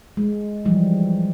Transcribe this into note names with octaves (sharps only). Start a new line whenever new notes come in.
G#3
E3 F3 G3